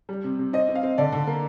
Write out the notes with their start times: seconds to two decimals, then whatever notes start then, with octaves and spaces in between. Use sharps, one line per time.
0.09 G3
0.24 C3
0.39 C3
0.53 C4 D#5
0.69 C4
0.75 F5
0.83 C4
0.98 D3 D5
1.12 D3
1.27 A#3